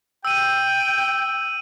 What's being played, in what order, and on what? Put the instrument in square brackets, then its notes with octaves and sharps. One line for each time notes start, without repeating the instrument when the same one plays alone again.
[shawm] G5 [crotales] E6 D#7